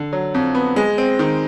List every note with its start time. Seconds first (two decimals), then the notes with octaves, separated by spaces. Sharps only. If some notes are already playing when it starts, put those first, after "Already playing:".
Already playing: D3
0.13 F#3
0.34 F2
0.55 B3
0.76 G#3
0.98 C4
1.19 D#3